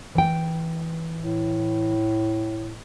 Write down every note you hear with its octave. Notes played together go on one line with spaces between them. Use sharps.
E3 G5
A2